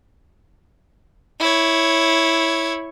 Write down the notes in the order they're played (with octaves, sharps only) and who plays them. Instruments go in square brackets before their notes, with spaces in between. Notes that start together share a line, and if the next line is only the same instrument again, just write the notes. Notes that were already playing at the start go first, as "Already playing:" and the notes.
[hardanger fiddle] E4 C#5